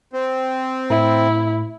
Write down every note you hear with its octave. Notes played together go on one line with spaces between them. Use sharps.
C4
A2 E4